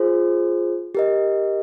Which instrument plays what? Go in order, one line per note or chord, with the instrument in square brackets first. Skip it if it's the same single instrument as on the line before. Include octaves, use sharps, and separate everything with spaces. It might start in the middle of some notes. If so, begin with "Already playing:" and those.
Already playing: [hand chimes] F4 G#4 C5
G4 A#4 D#5